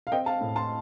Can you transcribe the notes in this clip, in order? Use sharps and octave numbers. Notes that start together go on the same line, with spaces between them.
F5
C4 D#5 G5
F5 A5
A2
A5 C6